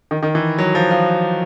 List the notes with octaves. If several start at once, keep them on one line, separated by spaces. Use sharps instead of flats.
D#3
D#3
E3
F#3
F3
F3